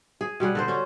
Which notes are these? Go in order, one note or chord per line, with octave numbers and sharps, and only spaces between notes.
G#4
B2 G3 G#4 F#5
D3 A4 C5
C#4 C5